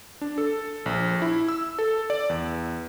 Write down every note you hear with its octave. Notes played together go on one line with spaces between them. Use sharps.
D4
A4
A#1
E4
E6
A4
D5
E2